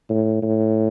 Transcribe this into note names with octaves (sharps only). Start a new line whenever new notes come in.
A2
A2